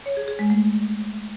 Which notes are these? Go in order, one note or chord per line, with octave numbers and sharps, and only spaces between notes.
C#5
G#4
G#4
G#3
A3